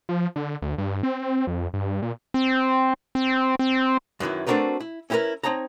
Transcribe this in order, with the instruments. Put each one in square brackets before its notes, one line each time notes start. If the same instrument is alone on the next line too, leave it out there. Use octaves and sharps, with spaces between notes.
[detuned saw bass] F3
D3
D2
G2
C4
F2
G2
A#2
[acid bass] C4
C4
C4
[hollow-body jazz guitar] F#2 D#3 E3 E4
A3 C4 D4 F#4 A#4 B4
E4
C#4 E4 G4 G#4 A#4 B4
C4 D#4 C#5 A5 A#5